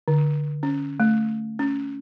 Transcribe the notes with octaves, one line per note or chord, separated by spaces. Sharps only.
D3
C#4
A3
C#4